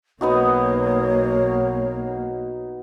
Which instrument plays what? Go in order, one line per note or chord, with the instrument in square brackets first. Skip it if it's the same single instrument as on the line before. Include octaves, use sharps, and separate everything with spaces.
[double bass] B1 A#3 [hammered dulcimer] B3 D#4 F#4 [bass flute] C#5